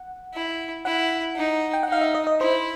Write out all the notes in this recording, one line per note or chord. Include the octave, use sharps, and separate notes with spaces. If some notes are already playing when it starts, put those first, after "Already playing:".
Already playing: F#5
E4
E4 F#5
D#4
G5
F#5
D#4 F5
E5
D#5
D#5
E4 C5